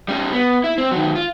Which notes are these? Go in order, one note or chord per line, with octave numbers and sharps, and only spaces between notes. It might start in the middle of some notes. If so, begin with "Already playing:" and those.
G3 C#4
B3
E4
C4
D#3 F#3
F4